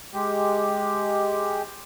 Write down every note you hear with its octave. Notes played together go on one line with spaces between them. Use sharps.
G#3 G4